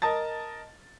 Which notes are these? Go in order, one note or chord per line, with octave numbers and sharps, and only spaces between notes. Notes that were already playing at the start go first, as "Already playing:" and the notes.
A#4 D#5 A5 A6